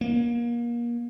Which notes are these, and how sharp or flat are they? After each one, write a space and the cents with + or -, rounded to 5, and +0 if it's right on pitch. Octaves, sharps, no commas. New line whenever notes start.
A#3 +30